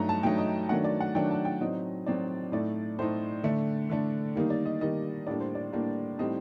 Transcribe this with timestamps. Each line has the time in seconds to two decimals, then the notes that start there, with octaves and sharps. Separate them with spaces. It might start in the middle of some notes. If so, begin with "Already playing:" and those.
Already playing: G2 F#3 A3 D#4 A#5
0.09 A5
0.23 G2 F#3 A3 D#4 G5
0.38 D#5
0.69 D#3 F#3 A3 D4 F#5
0.84 D5
1.00 F#5
1.15 D#3 F#3 A3 D4 G5
1.31 A5
1.45 G5
1.60 A2 F#3 C4 D#4 D#5
2.06 A2 F#3 C4 D#4 D5
2.52 A2 A3 D#4 D5
2.99 A2 A3 D#4 C5
3.43 D3 A3 D4
3.90 D3 A3 D4
4.36 D#3 G3 A#3 D#4
4.50 D5
4.66 D#5
4.81 D#3 G3 A#3 D#4 D#5
5.27 A2 G3 A#3 D4 D5
5.40 C5
5.55 D5
5.73 A2 G3 A#3 D4
6.19 A2 G3 C4 D#4 D#5